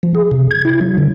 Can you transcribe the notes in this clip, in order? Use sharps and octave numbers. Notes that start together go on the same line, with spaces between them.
F3
G#4
C3
G#6
E4
F#3
D3